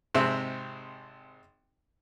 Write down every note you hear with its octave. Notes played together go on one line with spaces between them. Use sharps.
G#1 C3 G#3 C4 E5